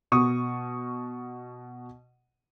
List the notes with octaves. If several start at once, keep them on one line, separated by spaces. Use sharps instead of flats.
B2 C#6 D#6